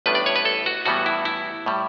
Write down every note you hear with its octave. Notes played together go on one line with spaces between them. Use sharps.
A1 A2 G3 B3 D4 B4
D5
C#5
B4
A4
F#4
A2 E3 G3 B3 F#4
E4
E4
A2 G3